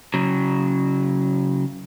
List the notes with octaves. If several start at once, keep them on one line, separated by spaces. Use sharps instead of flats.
C#3 F#3